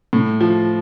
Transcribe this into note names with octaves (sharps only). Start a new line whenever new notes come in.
A2
F3